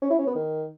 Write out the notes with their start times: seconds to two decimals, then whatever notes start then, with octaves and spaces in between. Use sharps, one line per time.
0.02 C#4
0.10 E4
0.18 C#4
0.27 B3
0.35 D#3